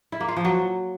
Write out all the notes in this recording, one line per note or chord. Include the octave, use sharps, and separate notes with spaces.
E4
A#3
F4
F3
F#3